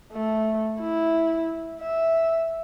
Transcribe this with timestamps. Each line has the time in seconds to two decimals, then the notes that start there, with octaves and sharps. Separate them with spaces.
0.12 A3
0.80 E4
1.81 E5